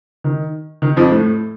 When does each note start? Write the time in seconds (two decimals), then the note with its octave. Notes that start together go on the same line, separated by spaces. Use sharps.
0.24 D#3
0.82 D#3
0.96 F2 F3
1.11 A2 A3